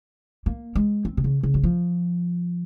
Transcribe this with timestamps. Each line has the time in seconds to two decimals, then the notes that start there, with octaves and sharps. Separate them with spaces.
0.46 A#3
0.75 G#3
1.05 C4
1.17 C3
1.24 C#3
1.43 C#3
1.54 F#3
1.63 F3